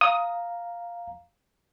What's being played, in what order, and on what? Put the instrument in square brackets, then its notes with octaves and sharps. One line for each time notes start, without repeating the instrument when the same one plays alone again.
[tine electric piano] F5 A#5 [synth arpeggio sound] D#6